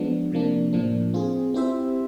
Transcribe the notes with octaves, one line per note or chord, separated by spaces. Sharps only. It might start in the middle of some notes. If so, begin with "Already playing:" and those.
Already playing: F3 G#3 B3 D4
C3 F3 A#3 D4
A2 F3 A#3 D4
C4 F4 G#4
C4 E4 G4 C5 E5